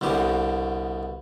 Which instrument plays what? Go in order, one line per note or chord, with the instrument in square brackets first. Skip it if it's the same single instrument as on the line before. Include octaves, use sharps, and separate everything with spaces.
[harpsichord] C2 B2 D3 G4